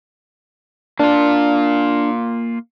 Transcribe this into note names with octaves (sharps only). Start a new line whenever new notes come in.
A#3 D4 F4